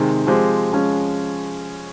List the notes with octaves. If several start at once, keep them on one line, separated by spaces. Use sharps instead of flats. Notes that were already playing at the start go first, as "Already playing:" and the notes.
Already playing: C3 D#3 G#3
F3 G#3 C4 G4 C5
F3 G#3 C#4